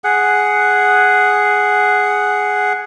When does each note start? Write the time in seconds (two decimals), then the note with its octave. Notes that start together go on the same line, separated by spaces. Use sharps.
0.04 G#4 F#5